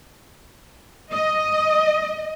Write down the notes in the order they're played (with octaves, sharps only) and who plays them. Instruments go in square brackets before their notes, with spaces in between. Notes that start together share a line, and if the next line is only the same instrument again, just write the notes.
[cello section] D#5 [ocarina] D#6